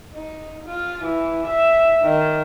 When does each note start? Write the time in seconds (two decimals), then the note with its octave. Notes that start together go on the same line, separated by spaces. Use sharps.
0.16 D#4
0.66 F4
1.05 E3
1.48 E5
2.03 D#3